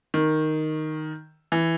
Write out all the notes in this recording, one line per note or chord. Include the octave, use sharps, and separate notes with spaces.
D#3
E3